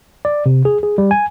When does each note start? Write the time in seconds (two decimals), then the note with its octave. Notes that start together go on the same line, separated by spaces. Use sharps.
0.25 D5
0.46 C3
0.65 G#4
0.83 G#4
0.98 G3
1.11 G#5